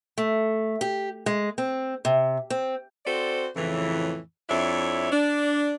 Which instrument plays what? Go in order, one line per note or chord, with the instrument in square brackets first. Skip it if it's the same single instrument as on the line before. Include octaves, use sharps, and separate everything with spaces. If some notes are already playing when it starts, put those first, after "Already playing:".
[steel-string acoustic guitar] A3
G4
G#3
C4
C3
C4
[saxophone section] C4 F#4 A4 C5 D5
F2 A2 C#3 E3
F2 D4 E4 C#5 E5
D4